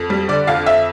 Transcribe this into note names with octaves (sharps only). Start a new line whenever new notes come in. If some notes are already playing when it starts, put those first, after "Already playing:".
Already playing: F2
G3
D3 D5
F2 F5
F2 E5